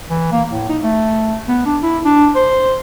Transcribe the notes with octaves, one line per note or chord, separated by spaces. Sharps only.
E3
A#3
A2
D#4
A3
B3
D4
E4
D4
C5